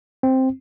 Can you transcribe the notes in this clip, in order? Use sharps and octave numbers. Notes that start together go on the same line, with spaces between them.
C4